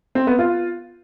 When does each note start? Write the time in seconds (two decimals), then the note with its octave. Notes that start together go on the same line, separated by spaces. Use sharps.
0.15 C4
0.27 B3
0.39 F4